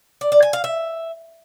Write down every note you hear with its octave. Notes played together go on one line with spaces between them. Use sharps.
D5
D5
G#5
F5
E5